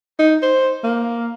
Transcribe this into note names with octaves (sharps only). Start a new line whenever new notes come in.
D#4
C5
A#3